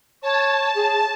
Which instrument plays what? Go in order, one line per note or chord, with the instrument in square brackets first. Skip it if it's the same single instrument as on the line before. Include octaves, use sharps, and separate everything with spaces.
[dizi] C#5 [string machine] A5
[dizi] G#4